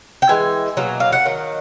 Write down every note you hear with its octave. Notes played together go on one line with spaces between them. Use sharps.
G5
E3 G#3 G#5
B2 F#3 A#3
F5
F#5
D#3 F#3